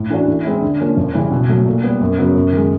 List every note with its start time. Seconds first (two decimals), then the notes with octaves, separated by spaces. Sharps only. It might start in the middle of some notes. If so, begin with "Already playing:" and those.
Already playing: A2
0.10 E3 A3 D4 F#4
0.28 E3
0.45 G#3 C4 E4
0.62 D3
0.79 F3 A#3 C#4
0.97 F2
1.14 C#3 E3 G3
1.31 B2
1.49 F#3 A3
1.66 A#2
1.83 G3 B3
2.01 F#2
2.18 C#3 F#3 B3
2.35 F#2
2.52 D#3 G#3